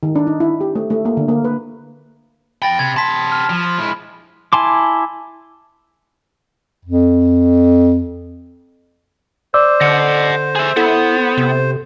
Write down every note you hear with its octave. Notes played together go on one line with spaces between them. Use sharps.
D#3
D4
D#4
E4
G4
A3
A3
A#3
D3
A#3
B4
F2 G5 B5 A6 A#6
C3 G#6
C3 A5 C6 B6
F6
F3
G#3 E4
E4 G#5 A5 C6 D6
F2
C5 D5 D6 E6
D3 D#5 F#5
G#4 E5
B3 E4 A4
C3